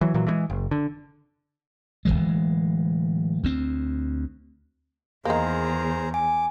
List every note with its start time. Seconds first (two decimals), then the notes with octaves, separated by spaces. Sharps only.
0.01 E3 F#3
0.14 A#2 E3 F#3
0.27 E3 F3 G#3
0.50 F#1
0.71 D3
2.05 D1 B1 E3 G#3
3.44 D2 C4
5.25 E2 D#3 A#3 G#4 C5 A#5
6.14 G#5 D6